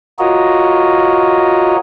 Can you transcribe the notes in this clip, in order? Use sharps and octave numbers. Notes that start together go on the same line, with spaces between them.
F4 F#4 A#4 C#5 D#5